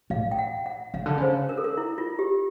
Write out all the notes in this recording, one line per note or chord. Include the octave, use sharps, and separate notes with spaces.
A2 F5
G5
F#5
F#5
C#3 F5
D3
C#3 C5
A#4
A4
A#4
E4
F4
G4